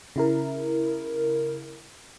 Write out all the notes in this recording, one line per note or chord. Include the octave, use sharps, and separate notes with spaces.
C#3 E4 A#4